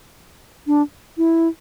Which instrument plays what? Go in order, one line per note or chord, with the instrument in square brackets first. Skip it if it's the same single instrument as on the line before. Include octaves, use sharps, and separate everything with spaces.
[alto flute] D4
E4